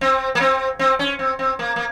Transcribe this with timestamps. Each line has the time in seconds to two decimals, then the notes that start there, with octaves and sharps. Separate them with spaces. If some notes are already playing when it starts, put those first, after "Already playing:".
0.01 C4
0.35 A#3
0.40 C4
0.79 C4
0.99 C#4
1.19 C4
1.39 C4
1.59 A#3
1.76 A#3